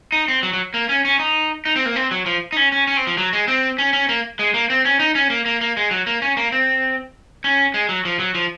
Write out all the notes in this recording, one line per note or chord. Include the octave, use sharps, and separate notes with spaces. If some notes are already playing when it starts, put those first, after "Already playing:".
D#4
C4
F#3
F#3
A#3
C#4
C#4
D#4
D#4
C4
A#3
C4
F#3
F3
D#4
C#4
C#4
C#4
C4
F3
F#3
G#3
C4
C#4
C#4
A#3
G#3
A#3
C4
C#4
D#4
C#4
A#3
A#3
A#3
G#3
F#3
A#3
C#4
A#3
C4
C#4
G#3
F#3
F3
F#3
F3